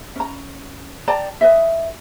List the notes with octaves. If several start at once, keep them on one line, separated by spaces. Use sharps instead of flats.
C#4 A#5
D5 G5 A5 A#5
B4 D#5 E5